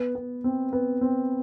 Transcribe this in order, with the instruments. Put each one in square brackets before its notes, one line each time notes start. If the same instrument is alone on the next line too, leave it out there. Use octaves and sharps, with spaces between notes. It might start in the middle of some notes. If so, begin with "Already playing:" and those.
Already playing: [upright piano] B3
B3
C4
B3
C4